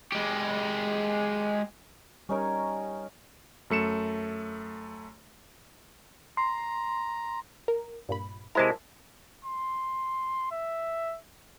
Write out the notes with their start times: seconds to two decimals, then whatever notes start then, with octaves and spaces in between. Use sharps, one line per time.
0.12 G#3 G4
2.29 G3 C#4 D#4 A#4 C#5
3.70 F#2 A3 C#7 E7
6.37 A#5 C6
7.68 A#4
8.09 G2 A#2 B5
8.55 C3 G#3 E4 A#4 C5 A5
9.45 C6
10.52 E5